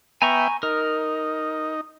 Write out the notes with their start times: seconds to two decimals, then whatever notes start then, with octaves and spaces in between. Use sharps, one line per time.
0.22 B3 E5 G5 G#5 A#5 C#6
0.63 D#4 A#4